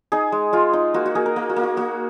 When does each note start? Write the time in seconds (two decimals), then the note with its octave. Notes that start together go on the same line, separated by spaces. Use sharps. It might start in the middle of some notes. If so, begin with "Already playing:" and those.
0.12 D#4 G#4
0.32 G#3
0.53 G#3 F4
0.73 D#4
0.94 A#3 F#4
1.06 F#4
1.15 A#3 G#4
1.26 A#4
1.36 A#3
1.49 F#4
1.56 A#3
1.63 F#4
1.77 A#3 F#4